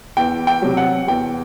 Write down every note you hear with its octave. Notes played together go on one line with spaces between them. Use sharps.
E2 G5
G5
C3 F#3
F#5
E2 G5